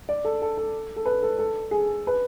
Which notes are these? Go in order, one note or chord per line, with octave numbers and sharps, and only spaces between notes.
D5
A4
A4
A4
A4
B4
A4
A4
G#4
B4